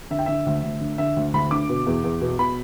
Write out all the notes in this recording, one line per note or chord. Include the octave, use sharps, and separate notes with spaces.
D3 E5
G5
D3 E5
D2
D2
D3
D3 E5
D2
D2 B5
D3 D6
B2
E2
E2
B2
B2 B5